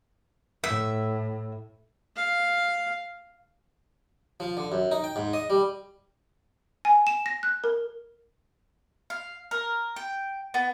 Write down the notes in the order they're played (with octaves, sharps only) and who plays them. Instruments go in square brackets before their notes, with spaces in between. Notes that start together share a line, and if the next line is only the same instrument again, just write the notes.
[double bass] A2 [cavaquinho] E5
[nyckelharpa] F5
[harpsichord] F3
D3
F#2
D#4
G5
G#2
D#5
G3
[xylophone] G#5
E7
A#6
F#6
A#4
[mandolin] F5
A#4
G5
B3